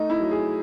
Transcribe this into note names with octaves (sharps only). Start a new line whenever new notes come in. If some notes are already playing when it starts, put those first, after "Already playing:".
Already playing: A3 D#4
E4
F#3
G#4